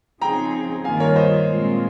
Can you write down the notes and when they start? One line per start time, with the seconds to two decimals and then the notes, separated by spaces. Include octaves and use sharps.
0.22 C#3 F3 C4 D#4 G#4 G5 A#5
0.84 G2 D#3 G3 A#3 F4 F5 G#5
1.00 A#4 C#5
1.16 C5 D#5
1.47 A#2 G#3 C4 F4